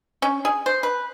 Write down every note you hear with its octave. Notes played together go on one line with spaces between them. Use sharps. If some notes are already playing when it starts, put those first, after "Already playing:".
C#4
G#4
C5
B4